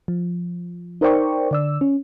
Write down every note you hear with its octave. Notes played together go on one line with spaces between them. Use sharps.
F3
D#4 A#4 C5 D5 G5 C#6
D3 D5 E6
C#4